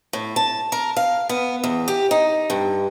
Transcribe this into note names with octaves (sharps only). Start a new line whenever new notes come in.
A2
A5
A#4
F5
B3
E2
G4
D#4
G2